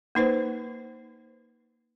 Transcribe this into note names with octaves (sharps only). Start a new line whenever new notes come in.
A#3 D#4 B4 C5